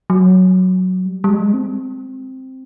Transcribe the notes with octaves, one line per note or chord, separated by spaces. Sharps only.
F#3
G3
G3
G#3
C4